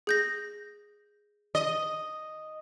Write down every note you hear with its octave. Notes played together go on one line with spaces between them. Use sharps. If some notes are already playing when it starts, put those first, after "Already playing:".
G#4 G6 A#6
D#5